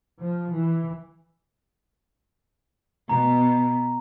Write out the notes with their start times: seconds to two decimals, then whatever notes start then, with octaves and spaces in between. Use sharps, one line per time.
0.20 F3
0.52 E3
3.09 B2 A#5